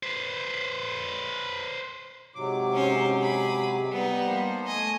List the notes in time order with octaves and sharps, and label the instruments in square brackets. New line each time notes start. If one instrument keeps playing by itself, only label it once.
[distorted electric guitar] B4 C5
[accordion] G#2 F#3 D6 [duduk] C3
[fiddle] C#4 C5
G#4 B5
[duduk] G3 [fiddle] B3 D#4
[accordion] F3 A#3 C5
[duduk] A3 [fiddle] D#5 [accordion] G#5